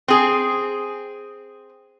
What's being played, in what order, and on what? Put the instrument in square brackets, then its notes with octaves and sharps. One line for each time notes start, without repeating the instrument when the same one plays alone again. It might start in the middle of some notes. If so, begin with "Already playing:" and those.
[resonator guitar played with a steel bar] C4 G#4